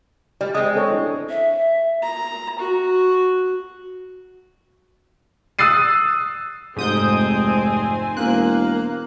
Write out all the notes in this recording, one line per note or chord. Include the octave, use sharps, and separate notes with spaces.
G3 D5
G#3 C4 D#6
A4 C#5
D4 E4
E5
A#5
F#4
D#6 E6 F#6 A6 C7 D#7
F1 G#2 C4 C5 G#5 D#6 G6
E1 A#3 F#6